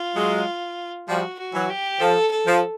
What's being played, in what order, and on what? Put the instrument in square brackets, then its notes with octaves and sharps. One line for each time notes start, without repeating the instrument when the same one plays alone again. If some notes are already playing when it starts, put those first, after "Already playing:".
Already playing: [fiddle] F4
[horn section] F#3 G#3
[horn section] F3 G3 [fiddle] F#4
[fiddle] F#4
[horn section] E3 F#3
[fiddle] G4
[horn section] F3 [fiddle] A4
[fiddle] A4
[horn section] F3